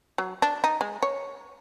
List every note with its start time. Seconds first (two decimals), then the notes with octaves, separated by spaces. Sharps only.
0.18 F#3
0.42 D4
0.64 D#4
0.81 G#3
1.03 C#5